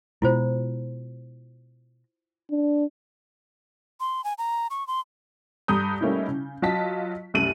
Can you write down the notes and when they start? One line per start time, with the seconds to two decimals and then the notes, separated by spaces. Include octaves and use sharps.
0.22 B2 G#3 E4 F4 C5
2.51 D4
4.00 C6
4.24 G#5
4.38 A#5
4.70 C#6
4.87 C6
5.68 G2 A4 A#5 D#6 G6
6.01 G3 A3 A#3 C#4 D#4 E4
6.28 C#3
6.62 F#3 F4 D#5 A5 B6
7.34 C2 F#2 A3 A4 D#7 F#7